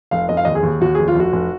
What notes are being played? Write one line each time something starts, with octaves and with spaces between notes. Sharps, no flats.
F1 F5
F1 D#5
F5
D#2 D#5
G#4
D#2
D#2 F#4
F1 G#4
F4
F1 F#4
F1